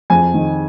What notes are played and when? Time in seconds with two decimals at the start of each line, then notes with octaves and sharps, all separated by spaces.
0.10 F2 G#5
0.34 D#3